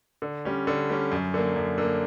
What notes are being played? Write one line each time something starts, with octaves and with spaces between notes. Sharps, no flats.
D3
G3 C#4
D3
G3 C#4
F#2
D3 A#3
F#2
D3 A#3